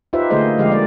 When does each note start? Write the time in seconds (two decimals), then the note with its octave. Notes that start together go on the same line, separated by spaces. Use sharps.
0.13 D#4 F4 G4 B4 C5 E5
0.30 D3 A3 A#3 G#4 C5 D#5
0.58 D3 F3 G#3 G4 F5
0.71 G#3 A#3 G4 D5